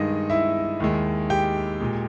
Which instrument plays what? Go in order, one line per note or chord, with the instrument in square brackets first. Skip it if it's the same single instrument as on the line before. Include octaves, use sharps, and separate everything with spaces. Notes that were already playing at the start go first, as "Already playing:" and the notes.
Already playing: [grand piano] G2 D#3 G#3 D#4 D#5
E4 E5
D#2 D#3 G#3
G4 G5
A#2 G#3